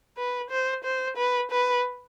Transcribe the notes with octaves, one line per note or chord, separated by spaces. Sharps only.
B4
C5
C5
B4
B4